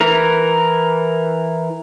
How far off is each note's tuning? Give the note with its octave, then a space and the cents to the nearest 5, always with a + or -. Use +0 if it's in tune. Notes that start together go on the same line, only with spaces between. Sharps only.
E3 +0 A#4 +0